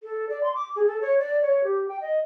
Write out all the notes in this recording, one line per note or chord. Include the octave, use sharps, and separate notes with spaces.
A4
D5
C6
D6
G#4
A4
C#5
D5
C#5
G4
G5
D#5